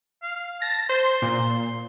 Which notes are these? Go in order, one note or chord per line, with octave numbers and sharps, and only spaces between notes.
F5
A5 A#6
C5 C6
A#2